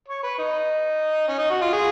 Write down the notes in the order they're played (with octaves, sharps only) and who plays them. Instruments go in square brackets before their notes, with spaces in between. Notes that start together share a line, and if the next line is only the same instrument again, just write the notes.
[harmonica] C#5
B4
D#4
C#4
D#4
F#4
F4
G#4